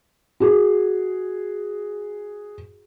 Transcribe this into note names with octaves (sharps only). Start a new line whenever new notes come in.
F#4 G#4